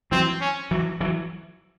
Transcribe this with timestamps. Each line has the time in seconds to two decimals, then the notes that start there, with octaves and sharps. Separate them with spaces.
0.12 E3 F#3 C4
0.41 C#4
0.71 E3 F#3
1.01 E3 F#3